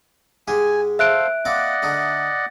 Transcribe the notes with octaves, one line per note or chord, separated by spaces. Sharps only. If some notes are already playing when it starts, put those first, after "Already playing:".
G#2 G#3 G4 G#5
A4 C5 E5 F5 F#6 D7
A#3 C4 D5 D#5 F#5 D6
D3 A3 D#4